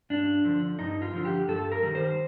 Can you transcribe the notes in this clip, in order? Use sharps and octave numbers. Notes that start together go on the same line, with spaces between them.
G2 D4
D3 F3
G2 D#4
F4
D3 F3
G4
G2 A4
A#4
D#3 G3
C5